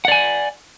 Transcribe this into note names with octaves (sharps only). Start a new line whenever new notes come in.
D5 F#5 G#5